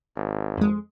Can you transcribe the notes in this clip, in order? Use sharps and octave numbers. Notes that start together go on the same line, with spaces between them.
G#1
F2 G#3